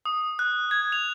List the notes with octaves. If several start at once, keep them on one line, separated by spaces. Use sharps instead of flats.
D#6
F#6
G#6
F7